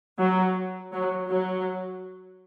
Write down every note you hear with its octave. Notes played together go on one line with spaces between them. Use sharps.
F#3
F#3
F#3